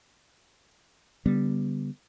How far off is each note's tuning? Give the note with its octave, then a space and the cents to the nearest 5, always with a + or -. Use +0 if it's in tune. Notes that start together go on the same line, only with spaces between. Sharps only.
D3 -40 G3 +0 B3 -15